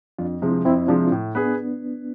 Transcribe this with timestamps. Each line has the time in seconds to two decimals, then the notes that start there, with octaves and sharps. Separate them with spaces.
0.19 F2 D4 F4
0.42 C3 F3 G#3 C4 E4
0.65 F2 C4 E4
0.88 C3 F3 G#3 D4 F4
1.12 A2
1.35 B3 D4 G#4 B4